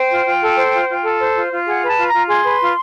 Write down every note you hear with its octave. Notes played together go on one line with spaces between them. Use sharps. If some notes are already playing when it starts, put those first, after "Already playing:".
Already playing: C5 G5
F4
F4
A4
C5
F4
F4
A4
C5
F4
F4
G#4 F#5
B4
A5
F4
A#5
F4
G#4 C6
B4
F4